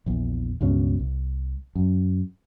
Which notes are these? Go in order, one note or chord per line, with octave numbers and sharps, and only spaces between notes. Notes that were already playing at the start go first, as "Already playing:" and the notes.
A#1 E2
C#2 G2 B2 C#4
C2
F#2